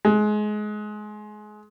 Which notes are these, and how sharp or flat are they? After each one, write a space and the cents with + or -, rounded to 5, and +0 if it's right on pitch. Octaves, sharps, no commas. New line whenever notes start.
G#3 +25